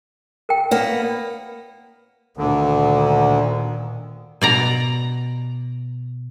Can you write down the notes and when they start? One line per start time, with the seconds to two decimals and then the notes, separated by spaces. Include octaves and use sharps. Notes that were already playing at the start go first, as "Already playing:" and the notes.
0.49 A#4 G5
0.71 A#3 B3
2.37 D2 A#2 D3 D#3
4.41 B2 D5 A#5